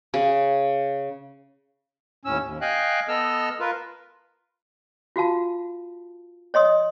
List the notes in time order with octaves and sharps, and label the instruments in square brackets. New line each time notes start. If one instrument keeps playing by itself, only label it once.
[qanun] C#3
[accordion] D#2 A2 C#4 E6
D#2
D#5 F5 G5 G#5 F#6
B3 A4 D#5 E6 F6
F4 A#4 B4
[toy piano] F4 F#4 F5 A5
C#5 D#5 C6 D#6